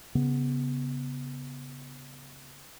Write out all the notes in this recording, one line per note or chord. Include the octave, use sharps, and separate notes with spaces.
C#3 B3